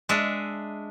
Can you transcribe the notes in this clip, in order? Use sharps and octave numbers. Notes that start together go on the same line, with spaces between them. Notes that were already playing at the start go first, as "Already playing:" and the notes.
G#3 D4 E5